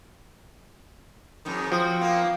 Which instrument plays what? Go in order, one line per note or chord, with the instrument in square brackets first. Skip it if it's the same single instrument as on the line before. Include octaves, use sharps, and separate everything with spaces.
[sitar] F2 G#2 D#3
[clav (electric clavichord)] F3 [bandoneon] C4 G5 [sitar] F#4
[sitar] A#3 B3 [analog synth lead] F5